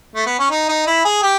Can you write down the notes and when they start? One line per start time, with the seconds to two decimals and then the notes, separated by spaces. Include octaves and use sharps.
0.15 A3
0.26 B3
0.39 C#4
0.50 D#4
0.69 D#4
0.87 E4
1.05 G#4
1.22 G4